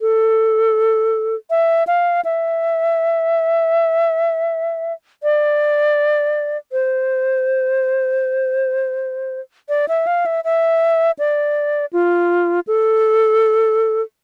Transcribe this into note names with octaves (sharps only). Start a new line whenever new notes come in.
A4
E5
F5
E5
D5
C5
D5
E5
F5
E5
E5
D5
F4
A4